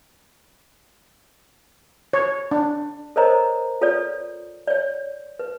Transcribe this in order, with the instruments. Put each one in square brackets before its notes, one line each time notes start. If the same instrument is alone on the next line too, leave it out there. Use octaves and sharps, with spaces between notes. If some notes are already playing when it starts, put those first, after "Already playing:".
[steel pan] C#5
D4
[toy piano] A4 A#4 C5 C#5 D#5 A#5
F4 A4 B4 C#5 D5
C#5 D5
B4